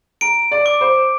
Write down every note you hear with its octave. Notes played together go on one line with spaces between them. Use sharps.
A#5 D7
D5
D6
C5